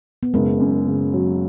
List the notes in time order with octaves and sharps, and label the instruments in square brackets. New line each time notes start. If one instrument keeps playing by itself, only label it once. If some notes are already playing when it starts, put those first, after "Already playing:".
[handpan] B3
[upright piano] F#1 [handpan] G#3
[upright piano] F#2
C#3
F#3